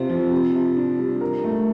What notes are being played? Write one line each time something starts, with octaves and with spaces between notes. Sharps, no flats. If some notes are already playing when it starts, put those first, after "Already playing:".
Already playing: C3 C4 F4
F3
C3
C3
D4
G3
A#4
A3